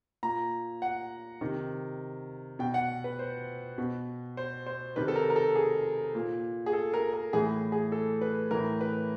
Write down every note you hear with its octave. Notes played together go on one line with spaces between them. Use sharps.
A#2 A#5
F#5
C3 D#3
B2 G5
F#5
B4
C5
B2
C5
C5
C3 D#3 B4
A4
A#4
A#4
A4
G#4
A#2
G#4
A4
A#4
A#4
A2 E3 G#4
G#4
A4
B4
A2 E3 A#4
B4